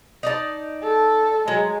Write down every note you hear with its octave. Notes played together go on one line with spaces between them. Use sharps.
D#4 D5 A5
A4
F#3 G#3